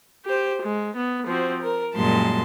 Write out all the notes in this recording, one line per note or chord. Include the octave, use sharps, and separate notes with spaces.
G4 C5
G#3
B3
F3 C4 F#4
A#4
F#2 A#2 G3 G#3 A5 C6